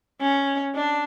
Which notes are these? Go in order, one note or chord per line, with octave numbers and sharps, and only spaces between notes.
C#4
D4